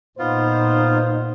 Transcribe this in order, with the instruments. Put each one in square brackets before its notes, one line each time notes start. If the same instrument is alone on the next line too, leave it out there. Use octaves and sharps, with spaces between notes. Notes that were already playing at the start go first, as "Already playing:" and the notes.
[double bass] A#2 D#4 [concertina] B3 F4 [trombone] C5